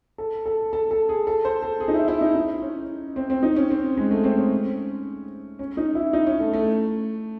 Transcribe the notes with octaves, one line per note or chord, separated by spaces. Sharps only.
A4
A4
A4
A4
G#4
A4
C5
A4
G#4
D#4
E4
E4
D#4
D#4
C#4
C4
C4
D#4
C#4
C4
G#3
A3
C4
C#4
C#4
D#4
E4
D#4
C#4
A3
A3